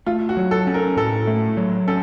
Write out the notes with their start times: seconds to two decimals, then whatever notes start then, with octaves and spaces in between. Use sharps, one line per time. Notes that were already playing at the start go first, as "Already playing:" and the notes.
0.06 A3 F4
0.29 F#4
0.37 F#3
0.51 A4
0.67 C#4
0.74 A#4
0.97 A2 A4
1.27 A3
1.57 F#3
1.88 C#4 A4